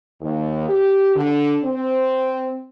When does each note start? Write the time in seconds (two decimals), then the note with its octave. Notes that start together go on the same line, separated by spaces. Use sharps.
0.22 D#2
0.69 G4
1.16 D3
1.64 C4